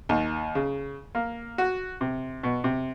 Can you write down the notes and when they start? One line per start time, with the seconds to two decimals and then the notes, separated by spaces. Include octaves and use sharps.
0.09 D#2
0.55 C#3
1.15 A#3
1.58 F#4
2.01 C3
2.43 B2
2.64 C3